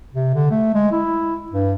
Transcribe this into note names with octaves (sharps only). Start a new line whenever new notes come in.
C3
D3
A3
G#3
E4
G2